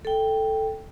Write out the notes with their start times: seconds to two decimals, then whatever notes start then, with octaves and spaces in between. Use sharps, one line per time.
0.05 A4 G5